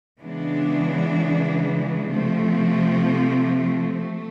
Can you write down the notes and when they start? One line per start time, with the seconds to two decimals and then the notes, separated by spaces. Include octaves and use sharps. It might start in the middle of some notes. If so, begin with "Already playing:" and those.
0.21 C#3 E3 G#3 B3 D4
2.10 C3 F3 A3 C4
4.00 A3